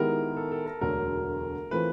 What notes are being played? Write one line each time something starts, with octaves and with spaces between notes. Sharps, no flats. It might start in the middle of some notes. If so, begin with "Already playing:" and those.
Already playing: D#3 G#3 B3 E4 G4 A#4
A4
A4
A#4
E1 D2 D3 F#3 A#4
E3 A3 C4 F4 A#4 B4